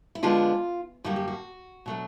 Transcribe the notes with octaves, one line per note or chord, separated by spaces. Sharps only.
E4
D3 F3 G#3 B3 D4 F4
F#2 D3 G3 A#3 F#4
G4
F#4
B2 F#3 A3 D4